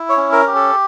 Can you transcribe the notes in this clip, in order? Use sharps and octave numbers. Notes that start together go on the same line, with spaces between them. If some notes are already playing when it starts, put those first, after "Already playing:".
Already playing: E4
C#5
C#4
A#4
G4
A4